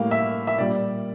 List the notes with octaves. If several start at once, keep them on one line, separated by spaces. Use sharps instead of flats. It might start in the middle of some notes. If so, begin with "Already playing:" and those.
Already playing: A2 G3 A#3 F5
E5
E5
A#2 G3 D5